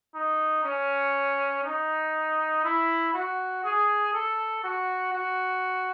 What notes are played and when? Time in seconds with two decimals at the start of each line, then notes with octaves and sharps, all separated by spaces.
0.14 D#4
0.64 C#4
1.64 D#4
2.64 E4
3.14 F#4
3.64 G#4
4.13 A4
4.64 F#4
5.13 F#4